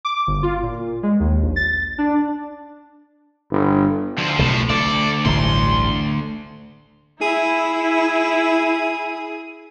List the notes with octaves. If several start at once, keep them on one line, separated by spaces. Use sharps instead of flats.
D6
G1
F4
A#2
G#3
D#2
A#1
A6
D4
G1
D2 F3 C5
B1 A2 C3
D2 A3 A4 D5
D1 A1 G2 C6
E4 G#4